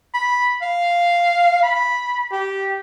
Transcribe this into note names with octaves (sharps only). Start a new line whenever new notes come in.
B5
F5
B5
G4